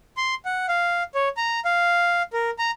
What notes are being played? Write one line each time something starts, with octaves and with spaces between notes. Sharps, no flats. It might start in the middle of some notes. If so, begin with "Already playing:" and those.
C6
F#5
F5
C#5
A#5
F5
A#4
A#5